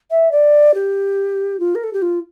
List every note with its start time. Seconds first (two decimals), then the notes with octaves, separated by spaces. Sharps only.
0.11 E5
0.31 D5
0.74 G4
1.59 F4
1.75 A#4
1.83 A4
1.93 G4
2.02 F4